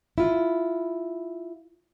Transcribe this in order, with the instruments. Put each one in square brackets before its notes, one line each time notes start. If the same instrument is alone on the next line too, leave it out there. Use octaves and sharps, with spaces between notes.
[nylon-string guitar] E4 F4